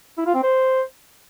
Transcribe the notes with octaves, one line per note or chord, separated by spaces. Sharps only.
E4
F4
C4
C5